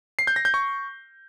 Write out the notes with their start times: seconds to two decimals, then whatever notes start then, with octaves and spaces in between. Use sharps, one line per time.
0.19 C7
0.27 G6
0.36 A#6
0.45 G6
0.54 C#6